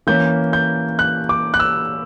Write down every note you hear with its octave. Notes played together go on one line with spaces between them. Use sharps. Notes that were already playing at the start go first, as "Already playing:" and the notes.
E3 A#3 C#4 G6
G6
F#6
D6
F#6
E6